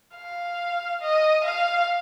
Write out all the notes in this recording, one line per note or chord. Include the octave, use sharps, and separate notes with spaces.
F5
D#5
F5